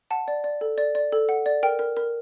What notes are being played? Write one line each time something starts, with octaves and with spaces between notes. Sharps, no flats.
F#5 A5
D5
D5
A4
D5
D5
A4
F#5
D5
A#4 G5
A#4
A#4